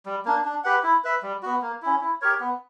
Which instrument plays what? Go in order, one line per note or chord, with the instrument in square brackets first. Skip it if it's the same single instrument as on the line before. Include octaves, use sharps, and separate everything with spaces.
[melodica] G3
A#3 D4
D4
G4 B4 F#5
E4
B4 E5
G3
B3 F#4
A#3
C#4 E4
E4
G4 A#4 C#5
B3